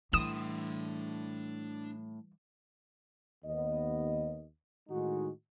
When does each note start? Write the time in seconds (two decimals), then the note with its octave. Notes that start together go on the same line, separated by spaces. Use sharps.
0.13 A2 E3 G3 D4 C6 D#6 E7
3.44 D#2 B3 D#5
4.89 A2 D#3 G#3 D#4 F#4